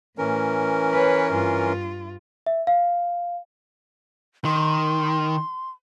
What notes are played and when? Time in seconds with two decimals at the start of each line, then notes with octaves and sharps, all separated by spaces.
0.18 A2 E3 C#4 A#4
0.93 B4 C#5
1.33 G2 F4
2.46 E5
2.67 F5
4.45 D#3 C6